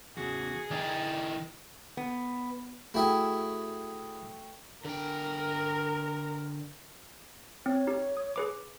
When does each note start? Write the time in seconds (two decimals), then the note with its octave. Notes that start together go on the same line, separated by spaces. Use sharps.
0.17 E2 C#3 F#4 G#4
0.71 E3 D#4 E4 A#4 D5 G5
1.97 B3
2.94 A3 E4 F#4 G#4 G5
4.85 D3 A#4 G5
7.66 C4 C#5
7.87 D#4 G4
8.17 D#6
8.36 G#4 B4 D6